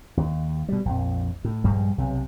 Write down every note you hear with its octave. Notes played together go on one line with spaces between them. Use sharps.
D#2
B2 G3
A#1 F2
A2
A#1 G2 G3 G#3
B1 C3